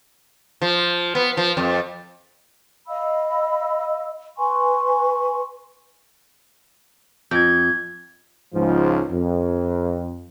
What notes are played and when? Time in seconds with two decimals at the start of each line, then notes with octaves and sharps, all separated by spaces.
0.62 F3
1.15 B3
1.37 F3
1.57 F2
2.88 D#5 F5 B5 E6
4.37 B4 G#5 C6 C#6
7.31 F2 G6 G#6
8.54 C#2 G#2 F3
9.11 F2